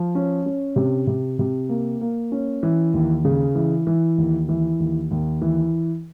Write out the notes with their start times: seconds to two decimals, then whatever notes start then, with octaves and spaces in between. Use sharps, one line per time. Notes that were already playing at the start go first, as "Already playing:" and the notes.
Already playing: F3
0.15 C#4
0.46 C#4
0.76 C3
1.07 C3
1.39 C3
1.69 A#3
2.01 A#3
2.32 C#4
2.63 E3
2.94 D#2
3.25 C#3
3.55 E3
3.87 E3
4.18 D#2
4.49 E3
4.80 D#2
5.11 D#2
5.42 E3